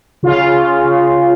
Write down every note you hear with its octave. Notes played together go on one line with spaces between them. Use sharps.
C#3 F4
C#3
C#3